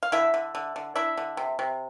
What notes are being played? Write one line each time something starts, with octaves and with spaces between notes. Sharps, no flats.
F5
D3 E4 E5
D3
D3
D3
D4 E4 E5
D3
C3
C3